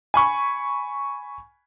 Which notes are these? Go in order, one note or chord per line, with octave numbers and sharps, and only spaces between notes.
G#5 B5 C#6